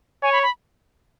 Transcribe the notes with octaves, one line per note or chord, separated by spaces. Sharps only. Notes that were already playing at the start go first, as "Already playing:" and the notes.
C#5 G#5
B5
B5